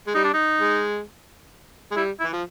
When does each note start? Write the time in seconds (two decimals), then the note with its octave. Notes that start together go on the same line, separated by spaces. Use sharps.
0.07 G#3
0.14 G3 D#4
0.24 D4
0.34 D#4
0.60 G#3
1.91 G#3
1.96 G3 E4
2.20 E4
2.24 E3
2.33 F3